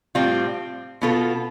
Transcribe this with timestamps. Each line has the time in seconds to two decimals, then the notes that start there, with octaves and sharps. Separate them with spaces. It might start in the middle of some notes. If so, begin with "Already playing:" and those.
0.15 A2 G3 C4 F4
1.02 B2 B3 F4 A4